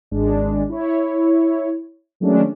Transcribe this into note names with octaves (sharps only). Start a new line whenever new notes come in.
G#1 G#3 D4
E4 C#5
D#3 F#3 G#3 A3 C#4 D4